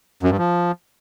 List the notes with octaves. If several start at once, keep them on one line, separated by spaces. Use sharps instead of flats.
F#2
G2
F3